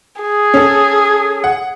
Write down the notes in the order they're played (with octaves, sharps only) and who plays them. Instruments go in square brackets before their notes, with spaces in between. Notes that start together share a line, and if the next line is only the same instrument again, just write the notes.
[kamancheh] G#4
[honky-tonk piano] C#4 A4
F#5